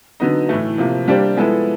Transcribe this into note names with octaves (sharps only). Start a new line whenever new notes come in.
D3 F#3 B3 D#4
A2 E3 A3
C3 F3 A#3
G3 A#3 D4 G4 C5
F3 G#3 B3 E4 A4